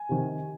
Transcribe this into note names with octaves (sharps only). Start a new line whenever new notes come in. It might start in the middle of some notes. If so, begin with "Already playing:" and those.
Already playing: G#5
C3 D#3